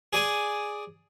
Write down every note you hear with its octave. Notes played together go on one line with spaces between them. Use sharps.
G#4 D5 G#5 D#6